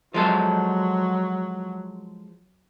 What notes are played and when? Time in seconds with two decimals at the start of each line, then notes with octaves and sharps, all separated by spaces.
0.14 F3 F#3 G#3 A4